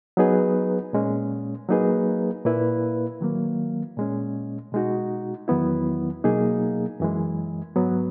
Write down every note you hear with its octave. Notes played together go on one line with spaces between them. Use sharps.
F#3 B3 D#4 G#4 B4
A#2 G#3 C#4
F#3 A#3 D#4 G#4 B4
A#2 A#3 E4 B4
D#3 F#3 A#3
A#2 G#3 C#4
B2 G#3 D#4 F#4
E2 D#3 F#3 B3 E4
B2 F#3 A#3 D#4 G#4
F#2 E3 G#3
G#2 F#3 B3